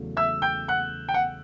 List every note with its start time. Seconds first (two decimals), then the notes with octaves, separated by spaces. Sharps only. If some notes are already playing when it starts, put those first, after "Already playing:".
Already playing: E2 C#3 F#3 A3
0.17 E5 E6
0.42 G5 G6
0.68 F#5 F#6
1.09 G5
1.14 F#5